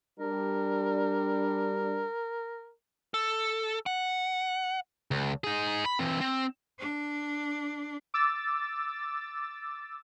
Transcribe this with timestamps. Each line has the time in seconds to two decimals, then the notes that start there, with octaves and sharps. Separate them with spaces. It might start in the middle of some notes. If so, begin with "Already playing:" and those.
0.20 G3 D4 A#4
3.14 A4
3.86 F#5
5.11 C#2
5.44 D#4 G#4
5.86 B5
5.99 E3 C4
6.21 C4
6.79 D4
8.14 D6 E6 A6